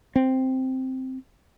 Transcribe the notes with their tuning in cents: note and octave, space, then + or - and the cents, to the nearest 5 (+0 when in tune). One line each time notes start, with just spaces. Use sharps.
C4 +0